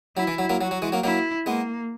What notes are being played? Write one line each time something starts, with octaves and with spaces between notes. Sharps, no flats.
F#3 E4
E3
F#3
F#3 A#3
F#3 F#4
F#3
E3 G#3
F#3 A#3
F#3 A#3 E4
G#3 A#3 B3